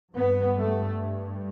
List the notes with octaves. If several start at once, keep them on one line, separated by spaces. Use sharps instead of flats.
G2 B3
A3